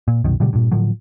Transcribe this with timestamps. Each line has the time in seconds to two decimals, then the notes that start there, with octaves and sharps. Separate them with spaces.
0.08 A#2
0.24 C2 F#2 B2 D#3
0.40 A#2 C#3 F#3 G3
0.53 G2 A#2
0.71 A2 D3 F3 F#3